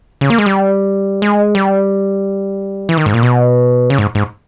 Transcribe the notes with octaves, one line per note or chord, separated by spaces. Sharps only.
C#3
A#3
G#3
G3
G#3
G3
E3
D#3
G#2
A#2
B2
C#3
G#2
G#2